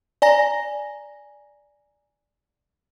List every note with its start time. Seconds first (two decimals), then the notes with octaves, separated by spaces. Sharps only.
0.22 D5 G#5 A#5 A#6